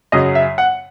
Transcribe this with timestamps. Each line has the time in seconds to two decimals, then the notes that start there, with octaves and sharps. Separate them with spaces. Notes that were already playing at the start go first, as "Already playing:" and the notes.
0.12 F#2 C#3 F#3 D#5
0.35 E5
0.58 F#5